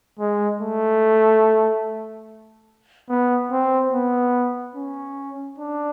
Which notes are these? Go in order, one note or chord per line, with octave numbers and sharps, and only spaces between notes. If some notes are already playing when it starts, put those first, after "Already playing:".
G#3
A3
B3
C4
B3
C#4
D4